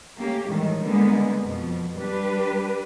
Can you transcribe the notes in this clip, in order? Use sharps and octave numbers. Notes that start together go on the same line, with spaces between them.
A3 A#3 C#4 G4
A2 D#3 E3 G3 G#3
D3 G3 G#3 A#3 B3
F2 B2 F3
G3 D4 G4 B4